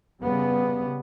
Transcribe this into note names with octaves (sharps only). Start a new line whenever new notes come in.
C#3 G3 B3